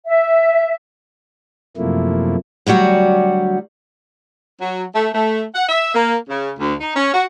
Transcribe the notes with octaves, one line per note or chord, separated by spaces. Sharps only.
E5
F#2 C3 F3 A3 A#3 E4
D2 F#3 G3 F#4 D5
F#3
A3
A3
F#5
E5
A#3
C#3
D2
D#4
C#4
F#4